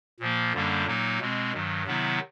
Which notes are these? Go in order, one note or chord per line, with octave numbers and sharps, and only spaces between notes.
A#2 F3 A#3
F#2 D3 G3 A#3 D4
A#2 F#3 A#3 D#4
B2 G#3 C4
G2 D#3 F#3
C3 D#3 F#3 B3 E4